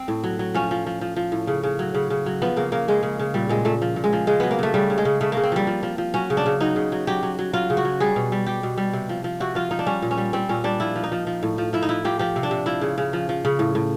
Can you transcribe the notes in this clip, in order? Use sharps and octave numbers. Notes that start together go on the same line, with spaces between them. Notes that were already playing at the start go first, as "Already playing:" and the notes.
Already playing: C4
A2
F#3
F#3
F3 C#4
F3
F3
F3
F3
A2
C#3
C#3
F#3
C#3
C#3
F#3
F3 B3
C#3 A#3
C#3 A#3
C#3 G#3
C#3
C#3
A#2 G3
A#2 G#3
A#2 A3
F3
A#2
G#3
F3
C#3 G#3
F#3 B3
A#3
C#3 A3
C#3 G3
C#3
G#3
C#3
C#3 A3
C#3 A#3
C4
F3 G3
F3
F3
F3
F#3 C#4
C#3
D4
C#3
F#3 D#4
C#3
F#3
F#3 G4
F#3
F#3
F#3 F4
C#3
F#4
F#3
G3 G#4
B2
G3
G3 G4
B2
G3
C3
F3
F3
C3 F#4
F3 F4
F3 D#4
D4
G3 C#4
A#2
C#4
G3
G3 C4
A#2 C#4
G3 D4
F3 E4
F3
D#4
F3
F3
A2
F3
F3 E4
D#4
F3 E4
F3 G4
F3 G4
C3
D4
C3
F3 E4
C#3
C#3
F3
F3
C#3
A2
A2